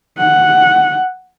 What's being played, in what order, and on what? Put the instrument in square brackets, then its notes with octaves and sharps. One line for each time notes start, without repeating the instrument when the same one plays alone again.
[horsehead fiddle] F#5